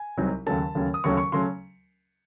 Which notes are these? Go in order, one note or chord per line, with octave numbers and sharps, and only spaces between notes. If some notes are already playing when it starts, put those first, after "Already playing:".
Already playing: G#5
C2 C3 F#3 C4 D#4
D#2 C#3 F#3 A3 C#4 A5
D#2 C#3 F#3 A3 C#4
D#6
D#2 C#3 F#3 A3 C#4 C#6
C#6
C#3 F#3 A3 C#4 C6